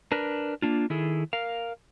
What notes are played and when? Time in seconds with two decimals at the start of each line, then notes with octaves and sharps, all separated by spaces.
0.12 D4 A#4 B4
0.62 A#3 D4 F4
0.90 D#3 E4 G#4 A4
1.33 A#4 F5